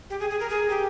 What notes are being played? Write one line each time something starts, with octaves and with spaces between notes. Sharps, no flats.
G4
G#4
G#4
A#4
G#4
G4